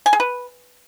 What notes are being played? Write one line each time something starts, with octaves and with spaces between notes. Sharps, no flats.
G#5
G#4
B4